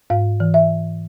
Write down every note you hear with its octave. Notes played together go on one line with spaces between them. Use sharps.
G#2 F5
E3
E5